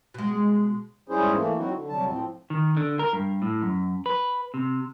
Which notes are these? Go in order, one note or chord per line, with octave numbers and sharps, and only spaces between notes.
B2 G#3
G#2 G3 C#4 E4 G#4 C5
E3 A3 A#3
F#3 C4 D#4 E4 F#4
D3
D2 C3 F#3 G3 A5
A2 F3 C4
D#3
D3
A#4
G2
A2
F#2
B4
C3